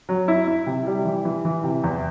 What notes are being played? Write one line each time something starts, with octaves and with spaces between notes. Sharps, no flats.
F#3
E4
E4
C3
G3
E3
E3
E3
C3
E2